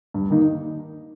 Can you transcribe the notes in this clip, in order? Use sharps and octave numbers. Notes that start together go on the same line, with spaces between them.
G2
D#3 A#3 D#4